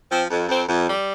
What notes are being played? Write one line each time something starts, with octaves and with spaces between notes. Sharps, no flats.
F3 C4
F2
F2 C4
F2
G3